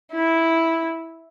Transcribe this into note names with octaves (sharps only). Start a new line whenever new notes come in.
E4